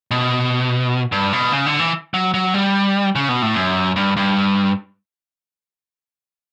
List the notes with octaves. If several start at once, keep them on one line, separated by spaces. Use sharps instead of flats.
B2
G2
B2
C#3
D3
E3
F#3
F#3
G3
C#3
B2
A2
F#2
G2
G2